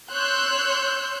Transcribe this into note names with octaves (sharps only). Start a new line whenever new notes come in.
C#5 C6 E6 F#6 G6